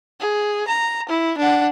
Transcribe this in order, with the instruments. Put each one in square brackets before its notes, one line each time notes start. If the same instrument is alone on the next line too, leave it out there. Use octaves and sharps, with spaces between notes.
[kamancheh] G#4
A#5
E4
D4 F#5